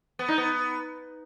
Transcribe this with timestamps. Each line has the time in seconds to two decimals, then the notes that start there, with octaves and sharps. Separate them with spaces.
0.19 B3
0.28 D#4
0.38 B3